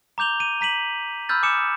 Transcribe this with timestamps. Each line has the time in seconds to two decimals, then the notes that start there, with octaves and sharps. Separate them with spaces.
0.18 A#5 D6 G6 F7 G7
0.40 D#7
0.61 A#5 B6 D#7 F#7
1.29 B5 E6 F6 G6 A6
1.43 G#5 D6 D#6 C#7 E7